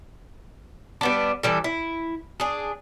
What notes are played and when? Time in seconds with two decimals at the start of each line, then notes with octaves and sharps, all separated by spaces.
1.01 G3 B3 D4
1.43 E3 G3 A4
1.64 E4
2.40 D4 G#4